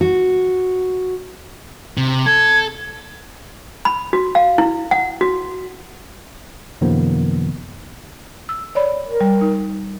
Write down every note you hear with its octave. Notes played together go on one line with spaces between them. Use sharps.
F#4
C3
A4 G#6
B5
F#4
F5
E4
F#5
F#4
F#2 C3 D#3 F3 A#3 B3
E6
C#5 D5 B5
A#4
G3
D#4